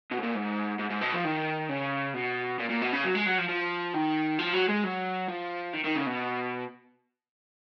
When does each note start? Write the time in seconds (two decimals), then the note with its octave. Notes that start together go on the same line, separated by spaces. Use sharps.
0.12 B2
0.19 G#2
0.23 A#2
0.35 G#2
0.79 G#2
0.90 G#2
1.01 B2
1.13 F3
1.24 D#3
1.69 C#3
2.14 B2
2.60 A#2
2.70 A#2
2.82 B2
2.93 C#3
3.04 F#3
3.15 G#3
3.26 F#3
3.38 F3
3.49 F3
3.94 D#3
4.39 F3
4.54 F#3
4.69 G#3
4.84 F#3
5.28 F3
5.73 D#3
5.85 D#3
5.96 C#3
6.07 B2